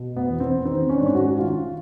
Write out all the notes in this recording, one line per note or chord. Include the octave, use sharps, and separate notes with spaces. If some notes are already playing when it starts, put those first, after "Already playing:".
Already playing: B2
B3
E2
C4
D#3 C4
C#4
D4
G#2 C#4
F#4
D#3 F4